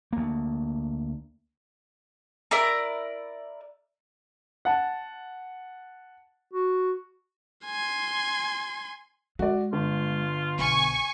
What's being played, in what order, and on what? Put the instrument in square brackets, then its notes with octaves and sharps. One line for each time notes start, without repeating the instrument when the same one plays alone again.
[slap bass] D2 A#3
[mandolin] E4 A#4 D5 A#5
[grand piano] F#5 A5
[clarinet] F#4
[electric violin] G#5 C6
[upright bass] G#3 [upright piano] F#4 D5
[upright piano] G1 [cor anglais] F4
[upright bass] B1 [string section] G#5 C#6